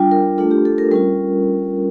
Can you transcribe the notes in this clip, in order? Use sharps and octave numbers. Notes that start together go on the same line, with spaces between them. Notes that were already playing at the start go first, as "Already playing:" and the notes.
Already playing: G3 D4 F4 G5
A#4
A3 D4 F4 A4
G4
A4
A#4
G3 C#4 F4 A#4